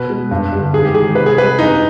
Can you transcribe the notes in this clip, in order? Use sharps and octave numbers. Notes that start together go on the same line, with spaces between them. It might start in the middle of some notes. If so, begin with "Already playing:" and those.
Already playing: B2 B4
G#3
G2
D3 G3
G#2 G#4
G4
D#3 G#3 G#4
C3 B4
G#4
G3 B4
G2 D#4